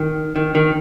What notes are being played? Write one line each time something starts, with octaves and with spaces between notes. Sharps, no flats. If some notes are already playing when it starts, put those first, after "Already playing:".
Already playing: D#3
D#3
D#3